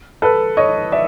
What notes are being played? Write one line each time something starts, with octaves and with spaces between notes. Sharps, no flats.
A4 B4
C#5 D#5
D5 E5